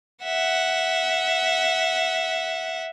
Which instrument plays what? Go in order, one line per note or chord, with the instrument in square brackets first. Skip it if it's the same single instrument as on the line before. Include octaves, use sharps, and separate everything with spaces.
[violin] E5 F#5